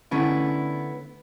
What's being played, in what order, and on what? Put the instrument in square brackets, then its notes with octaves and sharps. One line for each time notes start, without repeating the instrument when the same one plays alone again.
[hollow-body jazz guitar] D3 A3 B3 C#4 D4 E4